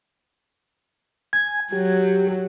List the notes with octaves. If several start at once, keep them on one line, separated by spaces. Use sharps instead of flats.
G#5 G#6
F#3 G4